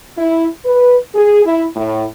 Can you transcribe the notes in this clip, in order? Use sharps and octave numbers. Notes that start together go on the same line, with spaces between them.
E4
B4
G#4
E4
A2